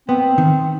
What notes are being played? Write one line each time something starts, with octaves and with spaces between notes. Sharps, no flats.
B3 C4
D#3